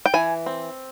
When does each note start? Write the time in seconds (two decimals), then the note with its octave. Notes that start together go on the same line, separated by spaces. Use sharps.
0.06 G5
0.14 E3 G#5
0.46 C4